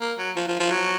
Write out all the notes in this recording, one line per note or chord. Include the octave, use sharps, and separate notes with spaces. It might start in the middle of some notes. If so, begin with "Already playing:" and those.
A#3
F#3
F3
F3
F3
F#3